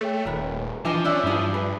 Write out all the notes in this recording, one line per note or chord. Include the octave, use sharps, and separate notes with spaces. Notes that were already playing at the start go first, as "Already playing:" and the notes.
A3 G#4 C#5 G5
D#1 A#4 B4
E3 F3 D4 D#5 G#5 A5 D6
C#4 D4 D5 E5 D6 E6
G2 E4 G#4
G#4 B4